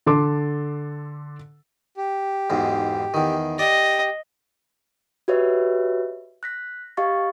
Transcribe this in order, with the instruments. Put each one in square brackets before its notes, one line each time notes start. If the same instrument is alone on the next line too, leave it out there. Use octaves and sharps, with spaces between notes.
[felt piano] D3 A4 C6 D6
[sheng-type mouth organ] G4
[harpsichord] B1 E2 G#2
E2 D#3
[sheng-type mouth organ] G4 [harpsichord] D5 [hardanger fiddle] D#5
[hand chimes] F#4 G4 B4 C#5 D#5 E5
F#6 A#6 B6
G4 D#5 F5 C#6 A6